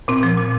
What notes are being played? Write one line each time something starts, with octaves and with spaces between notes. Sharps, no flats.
A#2 C4
F3
A#2